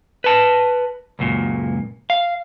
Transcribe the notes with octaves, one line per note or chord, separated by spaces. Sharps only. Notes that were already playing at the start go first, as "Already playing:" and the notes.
B4 A5
C#2 F#2 A#2
F5